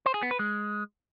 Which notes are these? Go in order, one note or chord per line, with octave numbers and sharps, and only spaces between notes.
C5
G#4
B3
B4
G#3